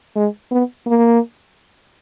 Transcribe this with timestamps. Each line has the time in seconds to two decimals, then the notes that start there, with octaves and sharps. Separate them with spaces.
0.16 G#3
0.51 B3
0.87 A#3